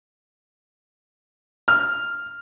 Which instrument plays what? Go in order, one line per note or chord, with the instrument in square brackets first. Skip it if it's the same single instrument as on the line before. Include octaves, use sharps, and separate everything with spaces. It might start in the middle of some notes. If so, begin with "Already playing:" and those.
[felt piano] F6